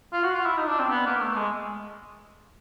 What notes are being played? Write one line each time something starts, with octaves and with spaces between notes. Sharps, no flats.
F4
F#4
F4
E4
D#4
D4
C4
B3
A#3
A#3
A3
G#3